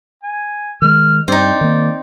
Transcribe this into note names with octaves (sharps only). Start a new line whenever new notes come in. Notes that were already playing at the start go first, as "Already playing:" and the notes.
G#5
D#3 G#3 F6
G2 C4 D#4 D5
D#3 A#3